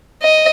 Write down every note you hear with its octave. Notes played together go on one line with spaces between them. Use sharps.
D#5